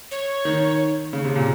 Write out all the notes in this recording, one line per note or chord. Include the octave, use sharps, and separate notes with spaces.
C#5
D#3
C#3
C3
A#2